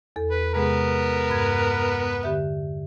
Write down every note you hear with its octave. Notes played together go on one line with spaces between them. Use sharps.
E2 A4
B4
C3 G#3 B3 G#4 A#4 B4
G2 G#6
D3 G4 E5